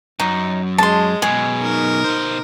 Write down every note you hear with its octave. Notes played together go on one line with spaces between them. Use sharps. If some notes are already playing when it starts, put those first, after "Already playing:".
F#2 D#4
G#3 A5 C6
F#2 B2 G#4
D#4 A#4
B2 C5